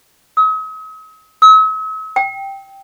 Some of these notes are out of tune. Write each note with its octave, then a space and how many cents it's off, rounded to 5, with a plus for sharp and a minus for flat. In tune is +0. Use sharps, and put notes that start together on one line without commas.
D#6 +45
E6 -45
G5 -5